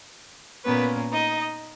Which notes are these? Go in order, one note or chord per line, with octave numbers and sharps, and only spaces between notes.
A#2 A#3 B3 C#4 B4
D#4 D#5